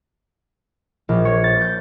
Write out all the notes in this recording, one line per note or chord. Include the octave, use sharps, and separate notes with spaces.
A#1
C#5
A6
G6